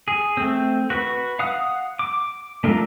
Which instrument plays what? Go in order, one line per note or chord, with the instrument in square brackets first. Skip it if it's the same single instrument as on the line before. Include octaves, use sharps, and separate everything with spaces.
[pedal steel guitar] G#4
A3 C4
F#4 B4 C#6
F5 F#5 D#6 F#6
D6
A3 D4 F4 A4 A#4